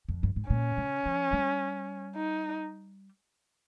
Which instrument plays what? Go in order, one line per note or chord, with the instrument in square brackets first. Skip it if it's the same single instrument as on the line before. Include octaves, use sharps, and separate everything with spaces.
[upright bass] F2
G2
G#2
[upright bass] A#2 [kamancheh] C#4
[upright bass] C#3
F3
G3
[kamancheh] D#4